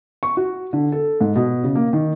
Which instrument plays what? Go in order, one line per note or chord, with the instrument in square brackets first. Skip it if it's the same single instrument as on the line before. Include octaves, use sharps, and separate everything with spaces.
[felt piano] C#6
F#4
D3
A4
G#2
B2
C#3
A#3
D#3